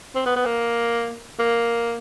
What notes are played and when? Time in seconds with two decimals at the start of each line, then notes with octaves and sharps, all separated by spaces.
0.15 C4
0.26 B3
0.36 B3
0.46 A#3
1.39 A#3